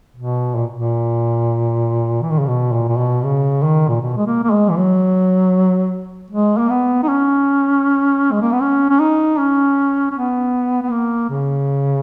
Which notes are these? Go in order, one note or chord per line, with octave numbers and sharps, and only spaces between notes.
B2
A#2
A#2
E3
D#3
C#3
B2
A#2
A#2
B2
C#3
D#3
A#2
B2
G#3
A#3
A#3
G#3
E3
F#3
G#3
A#3
B3
D#4
C#4
G#3
A#3
B3
C#4
C#4
D#4
C#4
C#4
B3
B3
A#3
C#3